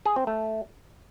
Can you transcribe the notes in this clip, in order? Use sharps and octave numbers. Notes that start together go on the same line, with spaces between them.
G#4
C4
A3